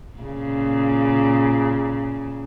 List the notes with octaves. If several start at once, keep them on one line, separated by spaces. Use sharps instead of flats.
A#2 C#3